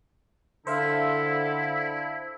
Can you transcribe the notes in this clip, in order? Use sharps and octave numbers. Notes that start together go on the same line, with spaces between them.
D3 E4 A4 C5 E5 F5